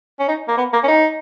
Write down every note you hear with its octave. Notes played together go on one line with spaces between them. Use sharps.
C#4
D#4
A#3
B3
A#3
C#4
D#4